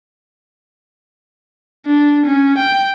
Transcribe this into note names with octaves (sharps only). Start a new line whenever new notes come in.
D4
C#4
G5